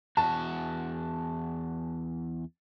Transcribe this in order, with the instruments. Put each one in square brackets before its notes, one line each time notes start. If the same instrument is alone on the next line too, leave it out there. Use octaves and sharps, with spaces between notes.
[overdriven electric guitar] E2 F#4 [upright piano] A5